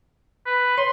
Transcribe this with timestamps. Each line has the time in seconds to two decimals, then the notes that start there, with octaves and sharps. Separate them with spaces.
0.46 B4
0.77 C#5 C6